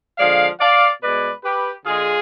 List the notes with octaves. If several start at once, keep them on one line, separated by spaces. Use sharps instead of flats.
D3 F3 G#3 D5 F5
D5 F5
B2 G#3 B4 D5
G4 B4
D3 G#3 F4 G#4